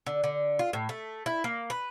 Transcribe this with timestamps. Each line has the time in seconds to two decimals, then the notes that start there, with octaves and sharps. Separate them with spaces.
0.06 D3
0.24 D3
0.59 F4
0.73 A2
0.89 A3
1.26 E4
1.44 A#3
1.70 B4